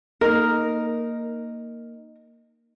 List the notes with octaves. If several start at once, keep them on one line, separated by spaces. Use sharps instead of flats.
A#3 D#4 A#4